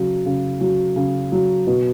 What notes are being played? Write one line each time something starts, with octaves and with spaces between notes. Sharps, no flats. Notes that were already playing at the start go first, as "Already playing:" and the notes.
Already playing: C#3 F#3
C#3
F#3
C#3
F#3
B2